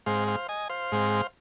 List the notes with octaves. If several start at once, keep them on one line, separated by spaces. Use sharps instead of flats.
G#2 G#3 C4 C5 F5
C5 F5
D#5 G#5
C5 F5
G#2 G#3 C4